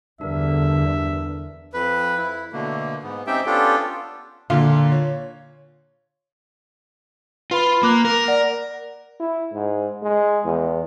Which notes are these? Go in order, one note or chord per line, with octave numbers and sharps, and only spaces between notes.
E2 G2 D3 D4 A#4 E5
F2 B4
E4
B2 D3 A3 A#3
G#2 B3
C4 C#4 D#4 G4 E5 G5
B3 C#4 D4 F4 G4 A4
A#2 D3 F4
C#5
F4 B4 F5 B5
A#3 D6 F#6
A#4
D5 F#5 A#6
E4
G#2
G#3
E2